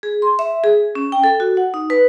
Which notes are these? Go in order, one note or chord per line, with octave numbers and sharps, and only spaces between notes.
G#4
C6
E5
G#4
C#4
G5
A4
F#4
F#5
D#4
B4